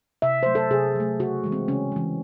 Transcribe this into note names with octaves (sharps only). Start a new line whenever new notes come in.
C3 E5
F#3 A3 C5
A4
C3 G#4
F#3 A3
C#3 F#4
E3 G#3
C4
C#3 C#4
E3 G#3